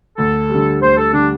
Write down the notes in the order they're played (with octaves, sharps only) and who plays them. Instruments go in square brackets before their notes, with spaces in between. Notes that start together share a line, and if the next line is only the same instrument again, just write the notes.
[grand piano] D2 [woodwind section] A4
[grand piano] G3
D3
[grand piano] D2 [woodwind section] C5
[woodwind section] A4
[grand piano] D3 G3 [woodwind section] D4